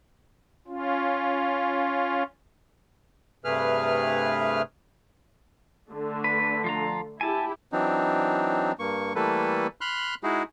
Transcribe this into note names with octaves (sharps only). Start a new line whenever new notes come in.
C#4 F4
G2 C3 A3 G#4 B4 F6
D3 A3
B4
F3 F4 A#5
E4 G4 G#5 A5
E3 F#3 C4 D4 D#4
G2 A#3 C#6
E3 G3 A3 A#3 A4 B4
B5 C6 F6 F#6
G#3 D#4 E4 F#4 G#4